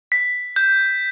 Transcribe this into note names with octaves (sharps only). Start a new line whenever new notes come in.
B6
G6